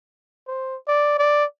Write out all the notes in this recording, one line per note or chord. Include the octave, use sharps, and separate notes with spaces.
C5
D5
D5